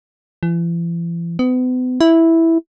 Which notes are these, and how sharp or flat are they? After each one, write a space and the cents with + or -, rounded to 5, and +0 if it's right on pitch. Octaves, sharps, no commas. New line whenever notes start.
E3 +45
B3 +40
E4 -5